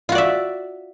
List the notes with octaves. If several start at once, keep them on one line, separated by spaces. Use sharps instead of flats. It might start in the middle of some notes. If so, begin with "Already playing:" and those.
F4 F#4 D5 E5